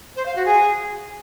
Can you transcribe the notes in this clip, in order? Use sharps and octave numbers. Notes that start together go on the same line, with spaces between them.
C5
F5
F#4
G#4